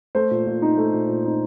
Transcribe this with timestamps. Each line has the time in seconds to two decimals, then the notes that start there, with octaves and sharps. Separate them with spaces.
0.15 A3 C5
0.31 A#2
0.47 A#2
0.62 D#4
0.77 A3
0.94 A#2
1.09 A#2
1.25 D#4